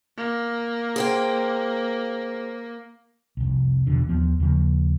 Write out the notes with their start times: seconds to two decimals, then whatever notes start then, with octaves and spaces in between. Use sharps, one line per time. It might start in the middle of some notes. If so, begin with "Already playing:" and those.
0.18 A#3
0.96 G#4 C5 G5
3.37 F1 C2
3.87 F1 E2 B2 D3
4.09 D#2 F3 B3
4.40 D#2 C#3 F3 A#3